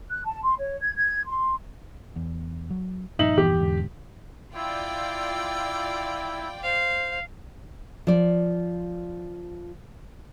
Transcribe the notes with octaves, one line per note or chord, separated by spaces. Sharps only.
F#6
A5
C6
C#5
G#6
G#6
C6
E2
F#3
G2 A#2 F3 D#4 E5 F#7
E2 G4
G#2 D3
E4 F4 D5 G5 E6
C5 F5
F3 D5